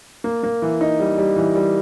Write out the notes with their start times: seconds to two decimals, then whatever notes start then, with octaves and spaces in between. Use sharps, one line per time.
0.24 A#3
0.43 A#3
0.62 E3
0.81 D#4
0.99 G3
1.18 G3
1.36 E3
1.55 G3